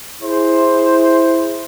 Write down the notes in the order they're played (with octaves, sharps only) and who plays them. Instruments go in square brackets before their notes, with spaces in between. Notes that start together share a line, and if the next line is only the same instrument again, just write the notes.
[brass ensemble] E4 G#4 C5